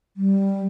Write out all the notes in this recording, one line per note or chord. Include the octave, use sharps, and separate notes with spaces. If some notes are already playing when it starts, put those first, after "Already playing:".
G3